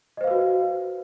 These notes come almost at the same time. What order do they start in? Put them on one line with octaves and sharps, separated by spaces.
D#5 C5 F5 B4 F#4